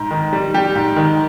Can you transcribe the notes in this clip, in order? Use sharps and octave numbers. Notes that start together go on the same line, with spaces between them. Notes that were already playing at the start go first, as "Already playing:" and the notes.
Already playing: G#2
D#3
G3
G3 G4
G#2
D#3